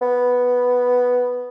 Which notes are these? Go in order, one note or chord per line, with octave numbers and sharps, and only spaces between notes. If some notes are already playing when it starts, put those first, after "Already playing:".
B3